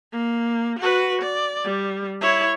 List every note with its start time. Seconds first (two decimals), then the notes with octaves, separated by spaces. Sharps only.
0.12 A#3
0.79 F#4 B4
1.22 D5
1.65 G3
2.21 E4 C#5